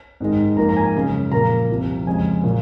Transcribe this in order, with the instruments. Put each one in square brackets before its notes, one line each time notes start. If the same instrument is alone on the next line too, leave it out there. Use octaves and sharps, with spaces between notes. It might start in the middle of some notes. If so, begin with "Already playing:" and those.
[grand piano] G#2 D#3 G#3
G#2 F3 A#3 A#5
A#5
G#5
F#2 C#3 G#3
A#2 F3 A#3 A#5
C2 C3 F3
F2 C#3 G#3 G#5
A#2 F#3